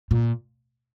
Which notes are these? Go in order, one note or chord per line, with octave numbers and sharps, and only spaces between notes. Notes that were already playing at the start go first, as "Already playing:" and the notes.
A#2